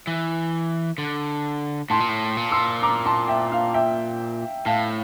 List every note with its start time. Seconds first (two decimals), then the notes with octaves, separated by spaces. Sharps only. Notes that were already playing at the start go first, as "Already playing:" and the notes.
0.07 E3
0.98 D3
1.90 A2 A5 C6
2.00 A#2
2.09 A2
2.37 A#2
2.52 C6 E6
2.83 A#5 D6
3.06 A5 C6
3.28 E5 G5
3.52 F5
3.74 E5 G5
4.66 A2 F5 A5